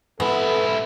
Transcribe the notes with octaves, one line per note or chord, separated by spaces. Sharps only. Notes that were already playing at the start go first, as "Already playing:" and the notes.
G#2 B3 E4 A4